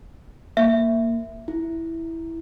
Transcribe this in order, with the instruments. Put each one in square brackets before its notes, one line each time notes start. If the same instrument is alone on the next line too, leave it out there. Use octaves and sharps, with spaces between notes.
[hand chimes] A#3 [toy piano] E5
[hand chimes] E4